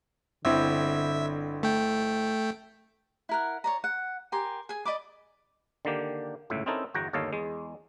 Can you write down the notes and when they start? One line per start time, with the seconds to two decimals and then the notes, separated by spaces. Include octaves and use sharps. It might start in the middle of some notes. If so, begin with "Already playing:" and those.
0.45 G1 D3 C4 E4 E5
1.63 A3 G5
3.29 E4 A#4 F#5
3.64 C#5 D5 A#5
3.84 F#5
4.32 G4 A#4 G#5 C6
4.69 G#4 G#5
4.85 D5 D#5 B5 D6
5.85 D3 D#3 A#3 G4
6.50 G1 C#2 A2 E5
6.66 C4 C#4 D#4 E4 A4 A#4
6.94 G1 E2 F#4 F#5 G5 A#5
7.13 G1 D#2 A4 C#5 D#5 F5
7.33 E2 G#3